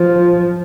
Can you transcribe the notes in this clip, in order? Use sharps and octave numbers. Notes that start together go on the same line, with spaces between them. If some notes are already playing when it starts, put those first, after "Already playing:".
Already playing: F3